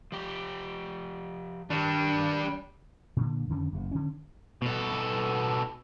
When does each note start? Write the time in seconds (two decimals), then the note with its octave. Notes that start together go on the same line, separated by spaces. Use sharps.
0.12 F3 G4
1.70 D#3 G3 D4
3.17 A#2 D3
3.49 F2 D3 D#3 C#4
3.73 F#1 B2
3.91 D3 C#4
4.62 B2 A4